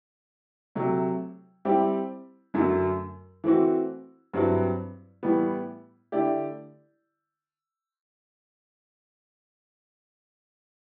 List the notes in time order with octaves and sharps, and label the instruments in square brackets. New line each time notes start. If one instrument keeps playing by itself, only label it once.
[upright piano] C3 F#3 A3
G3 C4 E4 G4
F#2 D3 F#3 A3
E3 A3 C4 F#4
G2 F#3 C4 E4 B4
A2 E3 G3 B3
D3 A3 E4 G4 D5